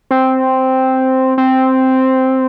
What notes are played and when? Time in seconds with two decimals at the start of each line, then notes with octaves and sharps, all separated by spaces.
0.11 C4
1.38 C4